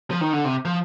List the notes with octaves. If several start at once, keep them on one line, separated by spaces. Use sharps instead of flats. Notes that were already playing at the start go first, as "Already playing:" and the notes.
F3
D#3
D3
C3
F3